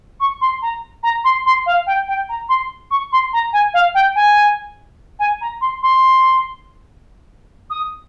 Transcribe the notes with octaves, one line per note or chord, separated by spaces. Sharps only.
C#6
C6
A#5
A#5
C6
C6
F5
G5
G5
A#5
C6
C#6
C6
A#5
G#5
F5
G5
G#5
G#5
A#5
C6
C6
D#6